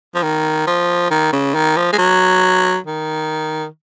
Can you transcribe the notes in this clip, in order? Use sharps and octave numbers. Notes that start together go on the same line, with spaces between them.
F3
D#3
F3
D#3
C#3
D#3
F3
G#3
F#3
D#3